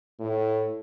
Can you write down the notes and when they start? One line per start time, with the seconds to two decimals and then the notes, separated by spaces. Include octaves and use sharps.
0.19 A2